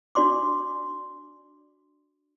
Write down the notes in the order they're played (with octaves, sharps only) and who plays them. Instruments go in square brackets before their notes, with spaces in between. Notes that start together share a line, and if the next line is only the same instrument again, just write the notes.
[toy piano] D4 F#4 D5 C6 D6